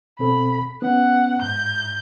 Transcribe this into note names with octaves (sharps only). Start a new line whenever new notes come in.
B2 C4 A4 B5
B3 C#4 F#5
G#2 G6